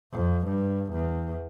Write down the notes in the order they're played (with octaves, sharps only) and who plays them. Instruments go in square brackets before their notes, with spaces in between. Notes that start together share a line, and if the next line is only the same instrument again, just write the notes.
[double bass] F2
G2
E2